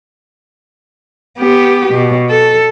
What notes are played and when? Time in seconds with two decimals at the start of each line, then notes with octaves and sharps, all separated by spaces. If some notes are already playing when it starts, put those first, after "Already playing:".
1.39 B3 G4
1.94 B2
2.30 A4